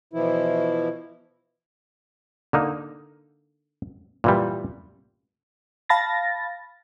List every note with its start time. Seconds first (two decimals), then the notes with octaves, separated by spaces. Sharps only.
0.13 B2 E3 F3 E4
2.53 D3 A#3 D#4
4.24 A#2 E3 G3
5.89 F5 A5 B5 A6 A#6